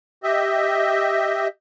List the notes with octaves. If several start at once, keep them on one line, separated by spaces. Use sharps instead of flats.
G4 D#5 E5